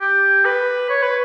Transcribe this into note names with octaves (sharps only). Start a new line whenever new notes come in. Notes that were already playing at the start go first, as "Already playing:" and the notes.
G4
B4
C#5
B4